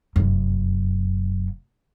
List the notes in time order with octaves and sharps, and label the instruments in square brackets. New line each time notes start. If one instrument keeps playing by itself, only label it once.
[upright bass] F1 F#2